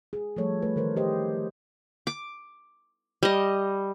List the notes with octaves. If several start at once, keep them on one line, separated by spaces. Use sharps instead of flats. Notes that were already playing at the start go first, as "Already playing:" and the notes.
G#4
F3 G3 A3 A4 C#5
A3 B4
D#3 E3 A#4 C5
G4 C5 D#5
D6
G3 D#5